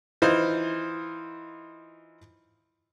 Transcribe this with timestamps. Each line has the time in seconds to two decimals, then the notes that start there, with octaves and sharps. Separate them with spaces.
0.22 E3 D#4 F4 C5